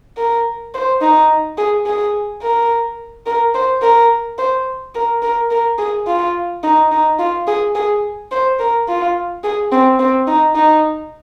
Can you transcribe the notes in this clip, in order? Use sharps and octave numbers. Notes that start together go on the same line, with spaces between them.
A#4
C5
D#4
G#4
G#4
A#4
A#4
C5
A#4
C5
A#4
A#4
A#4
G#4
F4
D#4
D#4
F4
G#4
G#4
C5
A#4
F4
G#4
C4
C4
D#4
D#4